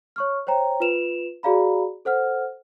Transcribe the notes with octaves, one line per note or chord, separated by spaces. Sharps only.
C#5 C#6 F6
C5 C#5 G5 A#5
F4 B4 E7 F7
F#4 G#4 D5 F5 A#5 B5
A4 C5 F#5 F6